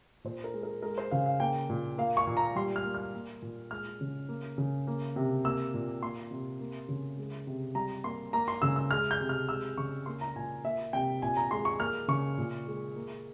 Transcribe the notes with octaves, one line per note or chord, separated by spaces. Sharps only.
A#2 C5
A#4
G#3
A#4
G#3 A#4
C5
C#3 F5
F5
A#3 G5
A#2
A#3 F5
C#6
A#2
A#5
G3 C6
F6
A#3
F6
A#3
A#2
G#3 F6
C#3
A#3
C#3
A#3
C3
A#3 E6
A#2
A#3 C6
C3
A#3
C#3
G#3
C3
G3 A#5
A#3 C6
A#3 A#5
C6
C#3 E6
E6
G#3 F6
G6
C3
F6
G#3 E6
C#3 C#6
A#3 C6
A#5
A#2 G#5
A#3 E5
C3 G5
A#2 G#5
A#5
G#3 C6
C#6
A#3 F6
C#3 C#6
A#2
G#3
A#3